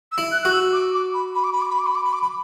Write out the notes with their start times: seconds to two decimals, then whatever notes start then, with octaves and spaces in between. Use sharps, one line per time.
0.11 E6
0.18 E4
0.31 F#6
0.42 F#4 F#6
0.52 E6
0.73 D6
0.94 D6
1.13 B5
1.34 B5
1.43 D6
1.52 B5
1.61 D6
1.69 B5
1.78 D6
1.86 B5
1.95 D6
2.04 B5
2.13 D6
2.22 B5